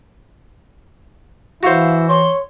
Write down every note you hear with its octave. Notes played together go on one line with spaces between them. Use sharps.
E3 E4 F#4 C5 F5
C#5 C6